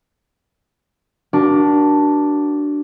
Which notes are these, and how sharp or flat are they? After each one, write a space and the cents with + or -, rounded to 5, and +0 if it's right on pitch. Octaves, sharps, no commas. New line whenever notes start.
D4 +0 F#4 +30 A#4 +25